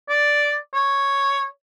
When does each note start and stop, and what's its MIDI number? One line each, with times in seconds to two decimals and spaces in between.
0.09 0.56 74
0.74 1.45 73